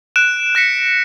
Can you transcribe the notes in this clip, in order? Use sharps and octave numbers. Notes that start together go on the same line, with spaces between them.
F#6 D7 E7
F#6 A#6 B6 C#7